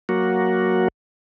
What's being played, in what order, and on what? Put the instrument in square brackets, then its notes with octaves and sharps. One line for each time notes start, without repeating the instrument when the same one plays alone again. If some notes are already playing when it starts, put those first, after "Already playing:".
[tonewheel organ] F#3 A#3 F#4